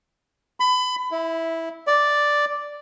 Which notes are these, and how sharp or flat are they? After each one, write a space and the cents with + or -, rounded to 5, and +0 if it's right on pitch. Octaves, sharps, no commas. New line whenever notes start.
B5 +30
E4 -10
D5 +0